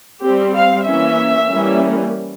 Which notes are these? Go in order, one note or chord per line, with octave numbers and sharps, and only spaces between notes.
G3 C4 G4
F5
E3 A#3 C#4 E5
E3 G3 A#3 C#4